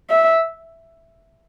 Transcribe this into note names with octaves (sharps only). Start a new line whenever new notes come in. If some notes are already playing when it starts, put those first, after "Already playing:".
E5